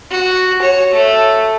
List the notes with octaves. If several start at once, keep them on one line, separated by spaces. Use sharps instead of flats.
F#4
C#5
A3